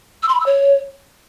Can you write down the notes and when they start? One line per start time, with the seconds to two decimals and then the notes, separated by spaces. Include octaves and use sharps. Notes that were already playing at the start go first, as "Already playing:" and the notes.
0.23 E6
0.29 C6
0.34 B5
0.40 E6
0.46 C#5